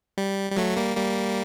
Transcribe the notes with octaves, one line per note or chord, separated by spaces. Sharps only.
G3
G3
F#3 A3
G3 A#3
G3 A#3